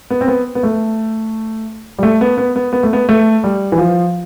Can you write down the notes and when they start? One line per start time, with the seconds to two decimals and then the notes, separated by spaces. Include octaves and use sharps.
0.10 B3
0.21 C4
0.28 B3
0.55 B3
0.63 A3
1.99 G3
2.03 A3
2.21 B3
2.38 B3
2.56 B3
2.73 B3
2.83 A3
2.93 B3
3.09 A3
3.44 G3
3.72 E3
3.78 F3